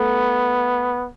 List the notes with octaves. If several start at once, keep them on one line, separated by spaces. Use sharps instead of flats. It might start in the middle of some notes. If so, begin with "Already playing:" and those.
Already playing: A3 B3